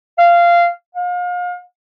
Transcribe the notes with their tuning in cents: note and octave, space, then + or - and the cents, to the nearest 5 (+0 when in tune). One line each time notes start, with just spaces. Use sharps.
F5 -15
F5 +35